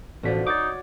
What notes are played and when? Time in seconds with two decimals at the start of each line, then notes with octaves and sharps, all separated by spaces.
0.23 A1 B2 D3 F3 B6
0.47 D#4 F#4 C#5 D6 A6